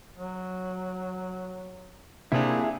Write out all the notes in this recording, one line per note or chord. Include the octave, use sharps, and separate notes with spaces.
F#3
C3 A#3 C4 D4 E4 G#4